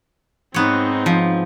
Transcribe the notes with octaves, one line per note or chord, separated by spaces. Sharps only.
G#2 B3 C4 D#4 C#5
F3